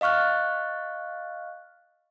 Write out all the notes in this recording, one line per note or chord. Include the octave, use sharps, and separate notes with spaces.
D#5 F5 C#6 F6 F#6